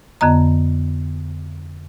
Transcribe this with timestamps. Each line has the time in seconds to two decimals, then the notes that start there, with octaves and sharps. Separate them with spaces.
0.21 F2 D3 B3 D#5 A#5